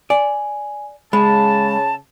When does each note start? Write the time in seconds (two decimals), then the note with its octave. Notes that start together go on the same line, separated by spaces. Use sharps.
0.10 D5 G#5
1.13 C#3 G#3 A5 B5